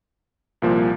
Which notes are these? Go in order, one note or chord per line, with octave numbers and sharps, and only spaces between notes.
C2 A#2 F3 A#3